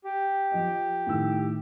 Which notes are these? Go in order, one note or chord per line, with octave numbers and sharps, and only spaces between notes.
G4
F3 D#5
A2 D#3 E6